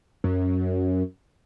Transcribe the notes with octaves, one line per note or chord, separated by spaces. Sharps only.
F#2